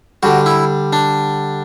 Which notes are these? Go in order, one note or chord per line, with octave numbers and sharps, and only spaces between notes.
D3 G3 F#4
E4
D4